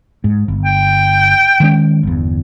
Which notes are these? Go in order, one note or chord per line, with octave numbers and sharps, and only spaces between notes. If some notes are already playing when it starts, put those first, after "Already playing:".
G#2
G1
G5
D#3 G#3 C#4
G1 E2